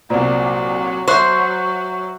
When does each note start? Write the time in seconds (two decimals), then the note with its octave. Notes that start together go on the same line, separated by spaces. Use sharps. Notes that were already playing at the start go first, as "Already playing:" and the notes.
0.10 C2 A#2 F#3 C5 D5 A#5
1.08 F#3 C5 C#5 E5 A#5 C#6 F#6 G6